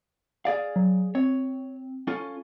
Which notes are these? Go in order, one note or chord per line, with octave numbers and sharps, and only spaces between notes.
G#4 D5 F5
F#3
C4 C#5
C#4 F4 A4